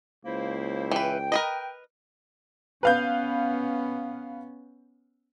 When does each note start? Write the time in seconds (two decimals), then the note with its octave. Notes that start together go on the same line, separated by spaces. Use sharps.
0.25 C#2 A#3 E4 C5
0.91 E3 B4 G5
1.32 A#4 B4 D#5
2.83 B3 C#4 B4 F5 G6